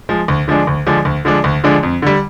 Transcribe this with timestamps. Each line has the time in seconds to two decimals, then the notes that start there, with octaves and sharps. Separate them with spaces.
0.09 F3 G#3
0.28 D2
0.48 D3 F3 G#3 D4
0.67 D2
0.87 D3 F3 G#3 D4
1.05 D2
1.25 D3 F3 G#3 D4
1.44 D2
1.64 D3 F3 G#3 D4
1.83 F2
2.02 D3 G3